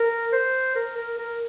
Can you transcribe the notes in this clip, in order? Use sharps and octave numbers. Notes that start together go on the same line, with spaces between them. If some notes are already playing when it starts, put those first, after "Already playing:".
Already playing: A#4
C5
A#4
A#4
A#4